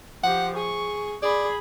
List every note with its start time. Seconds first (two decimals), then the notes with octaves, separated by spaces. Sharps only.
0.24 F3 G4 F#5
0.56 G#4 C#6
1.22 G#4 D5 B5